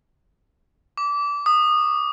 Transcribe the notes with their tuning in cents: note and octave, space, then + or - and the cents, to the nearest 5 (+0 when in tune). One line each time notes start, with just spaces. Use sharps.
D6 -20
D#6 -20